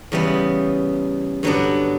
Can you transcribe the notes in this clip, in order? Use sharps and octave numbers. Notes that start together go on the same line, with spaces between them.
E2 C#3 G3 B3
G2 D3 F#3 B3 D4